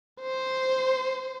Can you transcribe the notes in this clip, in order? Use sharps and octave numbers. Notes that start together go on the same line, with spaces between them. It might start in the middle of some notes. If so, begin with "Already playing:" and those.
C5